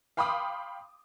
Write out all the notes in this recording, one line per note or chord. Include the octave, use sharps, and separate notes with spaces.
F5 G5 B5 C6 D6 D#6